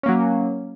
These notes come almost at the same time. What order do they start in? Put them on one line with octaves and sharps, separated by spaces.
C#4 A#3 F#3